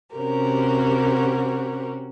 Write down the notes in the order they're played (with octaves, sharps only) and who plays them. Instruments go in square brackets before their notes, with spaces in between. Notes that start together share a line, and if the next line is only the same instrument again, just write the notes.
[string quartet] C3 C#4 F#4 G4 A#4 C5